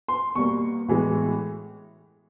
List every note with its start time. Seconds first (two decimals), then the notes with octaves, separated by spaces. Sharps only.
0.08 C6
0.35 B2 G3 A#3 C#6
0.88 A2 E3 G#3 B3